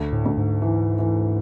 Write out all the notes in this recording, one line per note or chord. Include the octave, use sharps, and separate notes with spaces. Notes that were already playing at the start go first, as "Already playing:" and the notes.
Already playing: D2
A2
D2
G#2
E3
E3